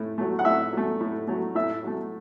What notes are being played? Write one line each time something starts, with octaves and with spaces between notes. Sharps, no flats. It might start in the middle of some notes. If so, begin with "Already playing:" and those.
Already playing: A2 A3
F#3 A3
F#5
A2 E5
F#3 A3
A2
F#3 A3
A2 E5
F#3 A3